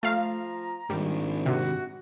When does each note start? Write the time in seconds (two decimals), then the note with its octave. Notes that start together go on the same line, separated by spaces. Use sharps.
0.03 F3 A3 F5 A#5
0.90 A#1 G#2 D#3 G3
1.46 C3 F#4